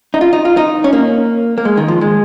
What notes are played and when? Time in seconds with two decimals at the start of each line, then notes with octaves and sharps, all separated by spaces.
0.14 D#4
0.21 F4
0.33 D#4
0.45 F4
0.57 D#4
0.84 C#4
0.93 A#3
1.58 A#3
1.65 G#3
1.77 D#3
1.88 F3
2.01 G#3